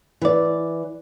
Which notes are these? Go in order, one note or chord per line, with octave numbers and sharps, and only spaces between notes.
E3 D5